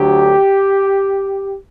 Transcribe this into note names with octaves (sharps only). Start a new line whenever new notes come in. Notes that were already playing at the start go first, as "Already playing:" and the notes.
Already playing: D2 D3 F#3 G4